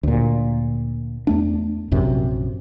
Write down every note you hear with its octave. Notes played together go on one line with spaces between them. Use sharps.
D2 A#2
E2 A3 D4
A#1 F#2 C3